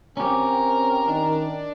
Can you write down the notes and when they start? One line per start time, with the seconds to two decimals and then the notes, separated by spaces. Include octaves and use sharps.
0.17 C4 C#4 G4 A#4
1.07 D#3 D4